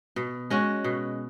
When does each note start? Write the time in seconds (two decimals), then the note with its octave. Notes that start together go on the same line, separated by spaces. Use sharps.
0.16 B2
0.50 G#3 C#4 F#4
0.84 B2